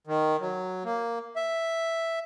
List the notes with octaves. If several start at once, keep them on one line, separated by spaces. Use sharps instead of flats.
D#3
F#3
A#3
E5